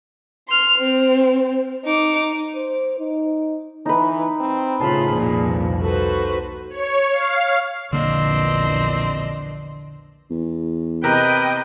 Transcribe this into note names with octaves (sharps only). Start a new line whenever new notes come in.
C6 F6
C4
D#4 D6
C5
D#4
E3 D#4 B4
C4
A2 C#3 F4 G#4 A5 B5
C2 F2 A#2 F3
F#4 A4 B4 C5
C#5
F5
A#1 E2 D3 A#3 C4 D4 D#5
E2
C3 A#4 B4 D#5 G5 A#5